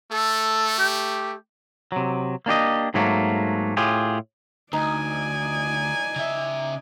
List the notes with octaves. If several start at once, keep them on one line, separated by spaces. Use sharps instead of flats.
A3 A4
G4
C3 F#3
A#3 D4 G4 D#5
G#2 F#3 A3 A#3
A2 F4 G4 G#4
D2 D#4 D5 G#5
C#3 E5